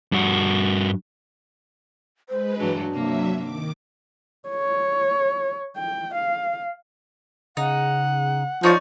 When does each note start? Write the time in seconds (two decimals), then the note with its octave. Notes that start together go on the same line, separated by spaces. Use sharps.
0.12 G2 F#4
2.29 G#3 B4 C5
2.59 G2 E3 F#3 D4
2.91 C3 F#3 A#3 E5
3.39 D#3 D6
4.48 C#5
5.76 G5
6.14 F5
7.57 C#3 D#4 F#5
8.63 F3 D#4 C#5 D5